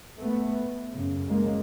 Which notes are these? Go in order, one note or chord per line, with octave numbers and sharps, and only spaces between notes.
A3 B3
F#2 C#3
G#3 A#3